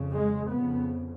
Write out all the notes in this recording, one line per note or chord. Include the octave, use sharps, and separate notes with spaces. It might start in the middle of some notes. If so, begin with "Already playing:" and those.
Already playing: F2 C#3
G#3
F2 C#3 B3